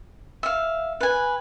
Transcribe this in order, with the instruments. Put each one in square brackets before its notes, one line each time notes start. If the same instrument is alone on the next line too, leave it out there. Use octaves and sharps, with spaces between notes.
[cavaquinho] E5 F5
B4 G#5